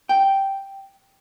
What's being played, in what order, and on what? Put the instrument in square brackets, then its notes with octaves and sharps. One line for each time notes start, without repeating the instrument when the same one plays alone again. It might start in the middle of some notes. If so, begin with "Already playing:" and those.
[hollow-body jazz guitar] G5